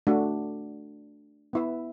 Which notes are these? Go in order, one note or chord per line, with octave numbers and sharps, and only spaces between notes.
A3 D4 F#4
B3 E4 B4 E5